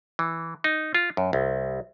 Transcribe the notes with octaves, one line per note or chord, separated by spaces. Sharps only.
E3
D#4
F4
F#2
C2